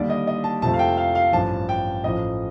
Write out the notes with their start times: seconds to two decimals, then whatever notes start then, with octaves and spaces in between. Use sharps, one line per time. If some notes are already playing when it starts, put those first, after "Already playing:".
Already playing: D#2 D3 G3 D5
0.10 D#5
0.27 D#5
0.44 A5
0.62 F2 C3 F3 A3 A5
0.73 F5
0.79 G5
0.97 F5
1.15 F5
1.32 A1 G2 F3 A5
1.69 G5
2.04 A1 A2 F3 D#5